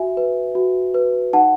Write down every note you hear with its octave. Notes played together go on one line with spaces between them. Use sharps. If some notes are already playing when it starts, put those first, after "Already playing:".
Already playing: F#4 E5 G#5
B4
F#4
B4
D#4 F#5 A5